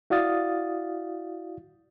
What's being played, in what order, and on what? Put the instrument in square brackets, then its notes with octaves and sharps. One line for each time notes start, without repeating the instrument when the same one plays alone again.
[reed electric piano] E4 F#4 D5 F5 D#6 A6